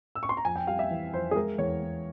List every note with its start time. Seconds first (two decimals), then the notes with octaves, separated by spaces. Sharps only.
0.15 E6
0.23 C#6
0.29 C6
0.37 A#5
0.45 F2 G#5
0.56 G5
0.67 G3 F5
0.79 E5
0.91 E3
1.13 F2 C5
1.31 G#4
1.35 G#3 A#4
1.58 E2 C#5
1.81 E2